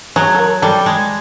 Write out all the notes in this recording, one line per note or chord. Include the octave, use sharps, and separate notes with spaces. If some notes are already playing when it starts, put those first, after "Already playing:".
F#3 G#4
A4
A#4
G3 A4
G#3